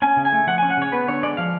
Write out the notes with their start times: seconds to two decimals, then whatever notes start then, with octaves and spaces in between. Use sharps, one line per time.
0.02 C#4 G#5
0.17 C#3
0.25 G#5
0.33 A3
0.47 F3 F#5
0.58 C#4 G#5
0.70 F#5
0.77 C#3 C#5
0.92 B3 B4
1.08 D3 C#5
1.23 G#3 D5
1.37 F3 F5